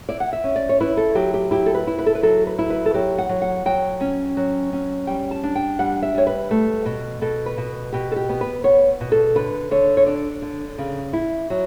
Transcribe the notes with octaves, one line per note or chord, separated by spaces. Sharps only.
E4 D5
F#5
E5
C#4
D5
C#5
E4 B4
A4
F#3 G4
G4
E4 G4
A4
B4
E4
B4
A4
B4
F#3 A4
B4
E4
B4
A4
F#3 G4
F#5
F#3
F#5
F#3 G5
C#4
F#3
C#4
G3 G5
A5
D4
G5
G3 F#5
E5
G3 C#5
B4
A3
B2
B2 A4
B4
B2
B2 G4
A4
G4
B3
B4
B3 C#5
B2
A4
D3 B4
D3 C#5
C#5
D4 D5
D3
C#3
E4
F#3